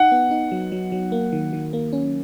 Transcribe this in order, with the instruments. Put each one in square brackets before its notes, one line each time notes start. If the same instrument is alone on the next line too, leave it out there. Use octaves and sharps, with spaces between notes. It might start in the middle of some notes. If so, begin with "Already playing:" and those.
Already playing: [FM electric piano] D#4 [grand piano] F#5
[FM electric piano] B3
D#4
F#3
F#3
F#3
A#3
D#3
D#3
A#3
C#4